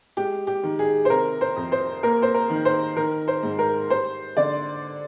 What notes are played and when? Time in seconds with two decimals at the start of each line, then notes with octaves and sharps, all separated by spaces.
0.17 G#3 G4
0.47 G4
0.63 D#3
0.79 G#4
1.05 C5
1.10 C3 A#4
1.41 C5
1.56 F2
1.72 C5
2.03 A#3 A#4
2.22 C5
2.34 A#4
2.50 D#3
2.65 C5
2.96 D#3 A#4
3.28 C5
3.43 G#2
3.59 A#4
3.90 G3 C5
4.37 D3 D5